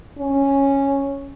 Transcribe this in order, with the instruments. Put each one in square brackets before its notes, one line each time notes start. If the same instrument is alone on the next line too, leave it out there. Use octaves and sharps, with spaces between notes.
[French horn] C#4